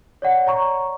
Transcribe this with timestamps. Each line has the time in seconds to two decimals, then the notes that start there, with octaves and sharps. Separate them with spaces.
0.22 C#5 D5 F#5
0.46 C#5 D5 A#5 C#6